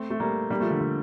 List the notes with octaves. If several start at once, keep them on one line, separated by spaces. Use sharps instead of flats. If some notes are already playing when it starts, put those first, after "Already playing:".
Already playing: A3 C4
A3
G3 A#3
G3 A#3
F3 A3
D3
D3